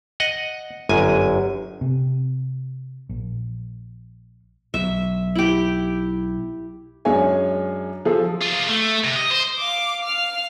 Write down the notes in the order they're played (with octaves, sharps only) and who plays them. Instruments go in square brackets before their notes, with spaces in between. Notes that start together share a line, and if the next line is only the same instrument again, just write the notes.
[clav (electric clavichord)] D#5 F#5
G1 F#2 G#5
[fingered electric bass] C3
A#1
[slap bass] B1 [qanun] E5
[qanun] E4 G4
[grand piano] F#2 G#3 D4 C#5 G#5
F3 G#4 A4
[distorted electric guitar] F4 G#4
A3
C3
D#5
C5
[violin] F5 D6
F5 F6